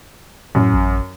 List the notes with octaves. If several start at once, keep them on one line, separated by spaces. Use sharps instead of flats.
F#2 A2
A1